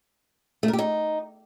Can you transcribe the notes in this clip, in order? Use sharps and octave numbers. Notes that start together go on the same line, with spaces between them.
A3
A#4
G4
D#4